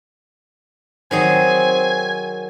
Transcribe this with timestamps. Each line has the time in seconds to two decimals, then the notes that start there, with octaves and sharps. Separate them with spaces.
1.11 D#3 F#3 C4 G#4 G#5